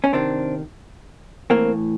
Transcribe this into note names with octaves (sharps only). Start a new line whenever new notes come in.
C#4
C3 D#3 C4 D4
A2 E3 A#3 C4